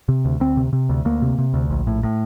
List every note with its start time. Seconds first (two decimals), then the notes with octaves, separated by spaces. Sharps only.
0.09 C3
0.25 D2
0.40 D2 C4
0.57 C3
0.73 C3
0.89 D2
1.05 D2 A#3
1.22 C3
1.38 C3
1.54 D2
1.70 A#1
1.87 A2
2.03 A2